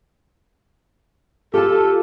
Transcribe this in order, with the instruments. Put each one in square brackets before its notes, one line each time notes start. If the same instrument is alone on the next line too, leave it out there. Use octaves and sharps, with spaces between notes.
[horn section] F4 A4 [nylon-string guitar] G4 A5